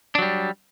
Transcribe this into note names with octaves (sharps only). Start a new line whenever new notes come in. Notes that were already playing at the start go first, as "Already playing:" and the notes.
F#3 G3 D4